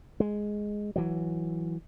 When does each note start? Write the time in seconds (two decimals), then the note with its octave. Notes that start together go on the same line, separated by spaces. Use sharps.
0.20 G#3
0.96 E3 F#3